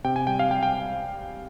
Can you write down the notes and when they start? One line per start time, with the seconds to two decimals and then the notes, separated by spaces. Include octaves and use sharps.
0.04 C3 G5
0.16 G#5
0.27 G3 G5
0.39 F5
0.50 G3 G5
0.63 G5